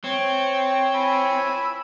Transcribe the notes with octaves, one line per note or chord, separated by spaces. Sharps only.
C4 C#5
G#5 B5 E6